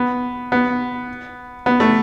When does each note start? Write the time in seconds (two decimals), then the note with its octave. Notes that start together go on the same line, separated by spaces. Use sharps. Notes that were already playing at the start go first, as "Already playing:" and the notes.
Already playing: B3
0.52 B3
1.66 B3
1.80 A3